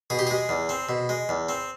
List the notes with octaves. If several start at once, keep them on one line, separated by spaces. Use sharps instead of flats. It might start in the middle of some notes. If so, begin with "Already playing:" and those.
B2 G#4
G4
G#3 G#4
E2
C4
B2
G#3
E2
C4